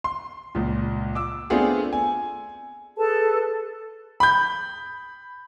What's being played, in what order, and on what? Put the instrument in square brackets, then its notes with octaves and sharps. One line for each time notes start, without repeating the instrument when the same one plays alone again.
[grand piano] C6
C#2 A#2
D6 E6
A3 B3 C4 D4 F4 G#4
G#5
[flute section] G#4 A4 B4 A5
[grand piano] B5 G6